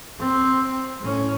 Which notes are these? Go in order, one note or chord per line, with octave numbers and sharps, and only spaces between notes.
C4
A2 C#4